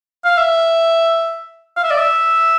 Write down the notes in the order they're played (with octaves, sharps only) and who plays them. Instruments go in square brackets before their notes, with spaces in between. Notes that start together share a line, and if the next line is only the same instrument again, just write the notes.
[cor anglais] F5
E5
F5
E5
D5
E5